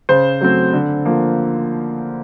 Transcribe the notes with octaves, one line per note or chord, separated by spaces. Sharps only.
C#3 C5
F#3 A3 C4
D3
F3 A#3